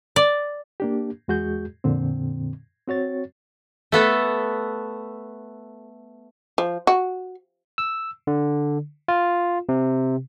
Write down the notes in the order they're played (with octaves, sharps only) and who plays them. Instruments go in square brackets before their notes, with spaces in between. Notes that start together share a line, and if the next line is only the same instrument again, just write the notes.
[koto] D5
[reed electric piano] A#3 D4 G4
E2 G#3 F#4 G#4 G6
F2 A#2 D3 C4
C4 F#4 C#5 A6
[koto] A3 B3 A4
[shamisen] F3
F#4
[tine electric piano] E6
D3
F4
C3